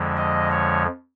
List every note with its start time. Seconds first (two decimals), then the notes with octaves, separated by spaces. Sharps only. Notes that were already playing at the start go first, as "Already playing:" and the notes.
Already playing: F2 D3 F3 G#3
0.17 D#5
0.51 C#5